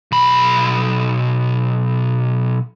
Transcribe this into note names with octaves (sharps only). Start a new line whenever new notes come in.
B1 B5